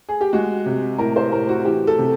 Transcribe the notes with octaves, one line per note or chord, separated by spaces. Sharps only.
G#4
G4
G#3 F#4
C3
A2 A#4
C5
A2 A#4
F#4
E3 G4
A4
C3